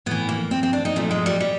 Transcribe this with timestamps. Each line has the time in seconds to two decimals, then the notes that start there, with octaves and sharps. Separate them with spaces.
0.06 A2 E3 B3
0.29 A#3
0.51 C4
0.63 C4
0.73 D4
0.85 D#4
0.96 A#2 F3 A3
1.11 G#3
1.26 G3
1.40 G3